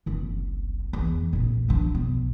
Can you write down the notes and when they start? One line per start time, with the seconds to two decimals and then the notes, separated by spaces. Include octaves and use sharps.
0.06 F#1 C2
0.93 E2
1.33 F1 A#1
1.68 F3 D4
1.95 B1